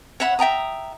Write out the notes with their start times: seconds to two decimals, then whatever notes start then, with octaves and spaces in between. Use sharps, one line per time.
0.20 C#5 E5 F#5 B5
0.39 E5 G5 A#5 D#6